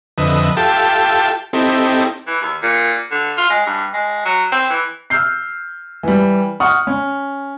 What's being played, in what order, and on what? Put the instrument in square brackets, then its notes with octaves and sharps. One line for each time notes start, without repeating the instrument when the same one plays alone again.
[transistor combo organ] F2 D3 B4 D#5 E5
F4 G4 A4 E5 G5 A5
C4 D#4 E4 G4 A4
[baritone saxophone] E3
D#2
A#2
D3
F4
G#3
G2
G#3
F#3
C4
E3
[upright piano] E6 F6 G6 C7
E3 G3
F#5 C#6 D#6 F6
C#4